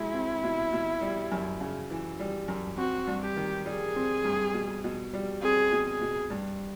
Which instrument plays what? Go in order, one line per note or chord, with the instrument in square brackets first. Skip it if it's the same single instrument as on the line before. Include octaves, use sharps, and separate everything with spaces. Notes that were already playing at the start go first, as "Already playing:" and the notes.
Already playing: [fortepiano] B2 G#3 [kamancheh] E4
[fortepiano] C4
B2
B2
G3
F#2
C#3
E3
G3
F#2
[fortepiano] C4 [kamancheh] F#4
[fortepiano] G2
[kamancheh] G4
[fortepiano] D#3
[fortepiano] G3 [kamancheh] G#4
[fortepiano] C4
G2
B2
B2
G3
[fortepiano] C4 [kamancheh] G#4
[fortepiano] B2
[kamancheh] G#4
[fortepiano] B2
G2